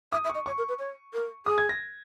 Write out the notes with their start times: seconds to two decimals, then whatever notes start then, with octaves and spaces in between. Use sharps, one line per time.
0.12 E5 D#6
0.24 E5
0.30 C#6
0.35 D#5
0.46 C#5 C#6
0.58 A#4
0.68 B4
0.79 C#5
1.13 A#4
1.46 G#4 D#6
1.58 G#6
1.69 A#6